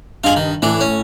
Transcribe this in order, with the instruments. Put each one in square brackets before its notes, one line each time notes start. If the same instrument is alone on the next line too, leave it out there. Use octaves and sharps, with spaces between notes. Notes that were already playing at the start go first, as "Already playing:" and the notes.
[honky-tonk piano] G2 D#5 F#7 [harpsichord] F4 G#4
[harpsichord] D#3
[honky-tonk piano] A2 [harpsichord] E3 D4
[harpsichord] C#4